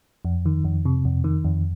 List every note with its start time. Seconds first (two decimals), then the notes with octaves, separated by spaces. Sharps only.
0.25 F2
0.46 D#3
0.64 F2
0.85 C3
1.05 F2
1.24 D#3
1.44 F2